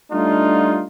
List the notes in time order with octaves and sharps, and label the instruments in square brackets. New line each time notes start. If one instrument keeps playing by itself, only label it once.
[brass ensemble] G3 A3 D4 D#4 F4